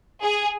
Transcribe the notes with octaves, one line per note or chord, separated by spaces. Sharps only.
G#4